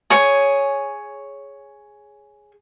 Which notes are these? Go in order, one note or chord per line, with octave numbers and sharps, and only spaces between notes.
G#4 C#5 G#5